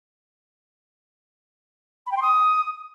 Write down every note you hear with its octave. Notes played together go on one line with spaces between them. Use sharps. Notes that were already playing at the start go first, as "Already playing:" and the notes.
B5
G5
C6
D#6